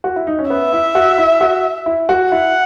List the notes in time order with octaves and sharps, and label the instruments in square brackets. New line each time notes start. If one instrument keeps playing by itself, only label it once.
[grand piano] F#4
E4
D#4
C#4
[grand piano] B3 [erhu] E5
[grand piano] E4
F#4
E4
F#4
E4
F#4
[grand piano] E4 [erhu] F#5